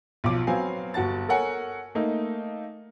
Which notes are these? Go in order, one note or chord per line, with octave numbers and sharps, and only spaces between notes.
B1 F3 D6
F#3 B3 C4 F5 G#5
G1 F#4 F#5 A5 A6
A4 A#4 C#5 F#5 G#5
A3 A#3 D#4